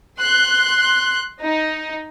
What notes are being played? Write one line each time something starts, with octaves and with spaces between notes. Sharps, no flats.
C6 F#6
D#4